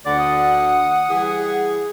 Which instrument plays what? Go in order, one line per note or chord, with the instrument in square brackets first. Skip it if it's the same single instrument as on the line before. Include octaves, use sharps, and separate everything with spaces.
[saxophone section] D2 D3 [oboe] D5 [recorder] F#5
[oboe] D#6
[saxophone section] E3 G3 G#4